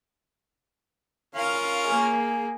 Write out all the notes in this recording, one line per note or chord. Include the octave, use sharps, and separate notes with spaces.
C#4 F4 A#4 F5
A#3 G#4